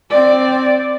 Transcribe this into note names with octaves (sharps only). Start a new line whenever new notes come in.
C4 D5